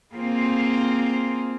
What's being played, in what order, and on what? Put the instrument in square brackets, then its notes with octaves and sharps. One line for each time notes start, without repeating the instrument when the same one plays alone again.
[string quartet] A#3 C4 F4 G#4 C5